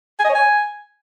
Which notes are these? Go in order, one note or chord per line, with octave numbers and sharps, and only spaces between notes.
G#5
D#5
C#5
G#5